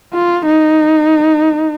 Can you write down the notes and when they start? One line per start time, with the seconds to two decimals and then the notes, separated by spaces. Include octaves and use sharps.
0.13 F4
0.46 D#4